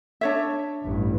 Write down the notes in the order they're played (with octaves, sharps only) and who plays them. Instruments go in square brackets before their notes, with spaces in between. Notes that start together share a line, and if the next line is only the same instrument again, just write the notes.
[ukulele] D4 C#5 E5
[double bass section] A1 G2